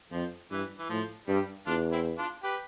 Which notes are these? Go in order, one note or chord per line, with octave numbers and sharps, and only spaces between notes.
F2 F3
G2 E3
E3
A2 F3
G2 G3
E2 D4 F4
C4 E4
D4 F4
G4 B4